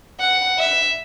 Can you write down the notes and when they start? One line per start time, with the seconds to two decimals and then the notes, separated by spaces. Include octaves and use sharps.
0.20 F#5
0.59 E5